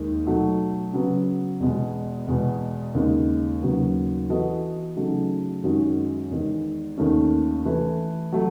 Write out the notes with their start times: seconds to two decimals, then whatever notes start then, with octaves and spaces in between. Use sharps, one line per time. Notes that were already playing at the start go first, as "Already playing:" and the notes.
Already playing: D#2 D#3 G#3
0.26 B2 F#3 A3 D#4 F#4
0.93 C#3 F#3 B3
1.60 E2 B2 G#3
2.28 E2 B2 G#3 B3
2.95 D#2 C#3 G#3 D#4
3.62 D#2 C#3 F#3 B3
4.29 E3 B3 F#4 A4 D#5
4.96 C#3 F#3 A3 D#4 G#4
5.64 F#2 D#3 G#3 D#4 F#4
6.31 E2 D#3 G#3
6.98 D#2 D#3 A3 C#4
7.65 E3 A3 E4 B4
8.32 F#3 A3